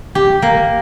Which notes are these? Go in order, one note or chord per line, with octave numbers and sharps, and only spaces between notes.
G4
A#3